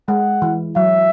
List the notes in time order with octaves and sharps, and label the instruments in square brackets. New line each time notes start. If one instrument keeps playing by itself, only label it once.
[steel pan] G#3 [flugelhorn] F#5
[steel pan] E3
[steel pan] F#3 [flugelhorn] E5